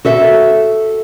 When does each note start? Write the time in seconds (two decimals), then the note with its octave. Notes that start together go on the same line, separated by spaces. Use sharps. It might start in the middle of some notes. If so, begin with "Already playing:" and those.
0.05 F#4 A4 E5